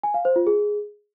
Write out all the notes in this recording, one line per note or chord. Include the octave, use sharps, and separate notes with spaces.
G#5
F5
C5
F4
G#4